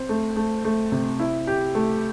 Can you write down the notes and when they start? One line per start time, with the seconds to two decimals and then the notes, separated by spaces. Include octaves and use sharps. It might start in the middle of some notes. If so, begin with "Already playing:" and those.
Already playing: C4
0.09 A3
0.37 A3
0.65 A3
0.92 C3
1.19 E4
1.47 G4
1.75 A3